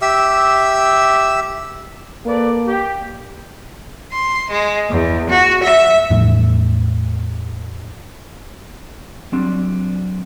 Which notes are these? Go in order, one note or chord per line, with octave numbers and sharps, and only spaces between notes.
G4 E5 E6
A#3 A4 B4 D5
G4
C6
G#3
E2
F#4
E5
E2 A2 F3 A3
F#3 G3 C4 D4